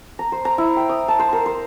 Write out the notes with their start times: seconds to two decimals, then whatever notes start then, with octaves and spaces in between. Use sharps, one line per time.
0.19 A#5
0.32 C5
0.45 A#5
0.58 E4
0.76 G5
0.89 D#6
1.08 A5
1.19 C5
1.33 A#4
1.46 C5